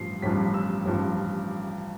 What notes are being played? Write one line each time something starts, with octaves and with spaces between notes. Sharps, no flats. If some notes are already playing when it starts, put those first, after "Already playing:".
Already playing: A1 G2 F3 C7
A1 G2 F3 B6
E6
A1 G2 F3